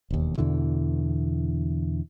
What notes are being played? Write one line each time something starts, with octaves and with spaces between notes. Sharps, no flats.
E1 D#2
E2 B2 D3 E3